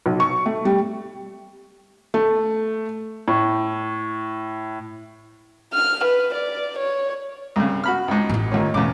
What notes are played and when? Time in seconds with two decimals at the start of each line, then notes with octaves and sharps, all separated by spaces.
0.06 B1
0.20 C#6
0.46 A3
0.65 G3
2.14 A3
3.28 A2
5.74 F6
6.05 B4
6.35 D5
6.79 C#5
7.56 C2 C#3
7.84 F#4 B5 F6
8.08 C#2 G#2
8.29 A1 E4
8.52 D#2 A#2 C#4
8.74 E1 E2 C#3 D6